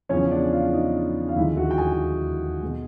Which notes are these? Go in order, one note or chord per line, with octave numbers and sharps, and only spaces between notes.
E2 C#3 F3 C#4 C#5
D4 D5
F4 F5
D#4 D#5
F5
D#2 D3 F3 G#3 E4 E5
F#4 F#5
G5
G#4 G#5
B2 G#3